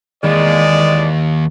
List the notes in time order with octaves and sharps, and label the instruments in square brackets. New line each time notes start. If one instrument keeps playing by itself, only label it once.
[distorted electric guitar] D#2 [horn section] E3 G#3 D5